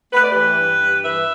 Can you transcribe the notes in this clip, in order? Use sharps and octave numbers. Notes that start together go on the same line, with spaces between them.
A3 B4
D5
G4 B4
E3
G2
G2
E3 B4 E5